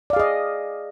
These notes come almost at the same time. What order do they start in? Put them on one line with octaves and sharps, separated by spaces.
D5 F5 G#4 D#5